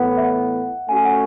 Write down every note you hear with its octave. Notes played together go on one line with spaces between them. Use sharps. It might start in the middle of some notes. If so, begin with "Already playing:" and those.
Already playing: A2 E3 B3 F#5
E5
F#5
A3 C#4 F#4 G#5
F#5